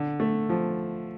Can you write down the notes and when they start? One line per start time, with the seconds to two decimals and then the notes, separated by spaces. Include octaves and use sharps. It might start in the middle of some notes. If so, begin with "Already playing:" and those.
Already playing: D3
0.20 A3
0.49 F3